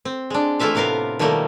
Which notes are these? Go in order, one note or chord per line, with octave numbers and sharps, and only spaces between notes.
C4
G#3 D4
E3 A3 E4 F4 E5 F5
A2 C3 B3 A#4 F5
B2 D#3 F3 G3 A3 A#3